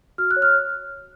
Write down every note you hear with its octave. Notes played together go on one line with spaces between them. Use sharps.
F#4 F6
F#6
C#5
F6